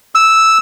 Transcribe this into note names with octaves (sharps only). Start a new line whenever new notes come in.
E6